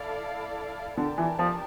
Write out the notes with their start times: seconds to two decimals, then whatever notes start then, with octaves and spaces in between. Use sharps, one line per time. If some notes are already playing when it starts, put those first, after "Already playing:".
Already playing: E4 A4 D5 F5
0.97 D3 D4 G4 A#4 D5 A5
1.18 E3
1.39 F3